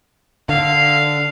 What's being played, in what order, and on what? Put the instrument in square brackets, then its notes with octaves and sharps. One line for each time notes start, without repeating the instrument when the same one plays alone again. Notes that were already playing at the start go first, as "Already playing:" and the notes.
[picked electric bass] D3 [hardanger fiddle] F5